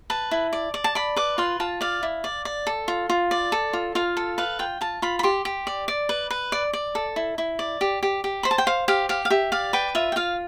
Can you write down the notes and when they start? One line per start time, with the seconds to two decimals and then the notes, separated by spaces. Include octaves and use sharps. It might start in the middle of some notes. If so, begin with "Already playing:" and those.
0.10 B4 A5
0.31 E4
0.53 D5
0.74 D5
0.84 A5
0.95 D5 B5
1.16 B4 D6
1.38 F4 C6
1.60 F4 A5
1.81 D5 F5
2.03 E4
2.24 D5
2.45 D5
2.67 A4
2.88 F4
3.10 F4
3.31 D5
3.52 A4
3.73 F4
3.95 F4 F5
4.17 A4
4.38 B4 F5
4.59 F4 G5
4.81 F4 A5
5.02 F4 B5
5.19 B5
5.23 G4 C6
5.45 G4
5.67 D5
5.88 D5
6.09 B4
6.30 B4
6.52 D5
6.73 D5
6.95 A4
7.16 E4
7.38 E4
7.59 D5
7.81 G4
8.03 G4
8.24 G4
8.43 C5 B5
8.51 A5
8.58 G5
8.67 C5 F5
8.88 G4 F5
9.09 G4 F5
9.25 F5
9.30 G4 E5
9.52 D5 F5
9.73 B4 G5
9.95 F4 E5
10.12 G5
10.16 F4 F5